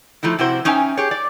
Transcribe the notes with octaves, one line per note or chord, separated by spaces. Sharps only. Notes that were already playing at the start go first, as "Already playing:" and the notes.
F3 A3 D#4 E4
C3 E4 F#4 C5
C#4 D#4 E5 G5 G#5
G4 G#4 C#5
D5